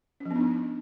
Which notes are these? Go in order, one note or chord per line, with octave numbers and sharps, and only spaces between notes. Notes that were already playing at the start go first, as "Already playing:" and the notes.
C#4
F3
B3
D4
D#4